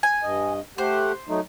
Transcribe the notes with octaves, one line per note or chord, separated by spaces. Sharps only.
G#5
G2 D#5
A3 G4 C5 F#5
F#3 A3 D#4